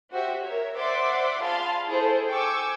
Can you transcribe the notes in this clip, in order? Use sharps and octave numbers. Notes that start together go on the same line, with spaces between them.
F#4 G4 C5 E5
A#4 C#5 E5
C5 D5 E5 F#5 C6 D6
F4 G#4 F5 A5 B5 C6
E4 G#4 A4 C5
G5 G#5 C#6 D6 E6